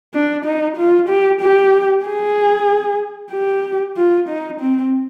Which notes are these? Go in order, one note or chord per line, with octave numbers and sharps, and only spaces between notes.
D4
D#4
F4
G4
G4
G#4
G4
F4
D#4
C4